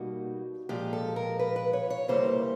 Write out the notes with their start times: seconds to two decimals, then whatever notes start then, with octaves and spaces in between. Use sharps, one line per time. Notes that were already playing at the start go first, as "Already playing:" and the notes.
Already playing: B2 G3 A#3 D#4 F#4
0.69 A#2 F3 G#3 G4
0.93 A4
1.16 A#4
1.39 B4
1.56 B4
1.73 C#5
1.90 C#5
2.08 D#2 C#3 E3 G3 A#3 C5